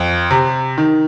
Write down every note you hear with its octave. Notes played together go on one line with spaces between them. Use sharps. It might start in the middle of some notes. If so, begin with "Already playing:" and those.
Already playing: F2
C3
D#3